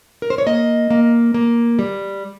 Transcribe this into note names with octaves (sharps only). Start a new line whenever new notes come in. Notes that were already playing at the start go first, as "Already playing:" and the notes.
A#4
C5
C#5
A#3 D#5
A#3
A#3
G3